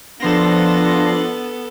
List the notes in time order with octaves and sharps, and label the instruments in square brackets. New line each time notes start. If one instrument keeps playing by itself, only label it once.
[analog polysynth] F3 C6 A#6 [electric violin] B3 A4 [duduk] D4